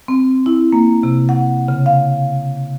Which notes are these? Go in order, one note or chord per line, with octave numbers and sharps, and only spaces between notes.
C4
E4
A#3
C3
F#5
C#3
F5